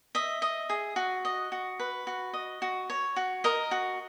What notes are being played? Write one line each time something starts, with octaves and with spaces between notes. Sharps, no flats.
D#5 E5
D#5
G#4
F#4
D#5
F#4
B4
F#4
D#5
F#4
C#5
F#4
A#4 D#5
F#4